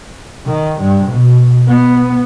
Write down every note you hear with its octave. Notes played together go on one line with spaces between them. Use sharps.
D#3
G2
B2
B3